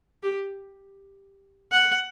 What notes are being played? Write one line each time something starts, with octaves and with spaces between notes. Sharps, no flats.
G4
F#5